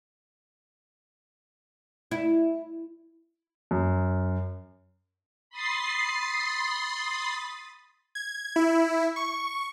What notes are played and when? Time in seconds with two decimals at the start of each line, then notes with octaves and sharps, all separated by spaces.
2.11 E4
3.71 F#2
5.50 B5 C6 D#6 A6 C7
8.15 G#6
8.56 E4
9.16 C#6